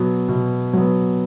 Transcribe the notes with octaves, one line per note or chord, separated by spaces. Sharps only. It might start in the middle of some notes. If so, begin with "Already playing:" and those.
Already playing: B2 F#3 B3
B2
F#3 B3